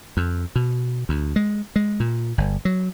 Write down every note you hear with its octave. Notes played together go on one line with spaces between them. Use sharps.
F2
B2
D2
G#3
G#3
A#2
G1
F#3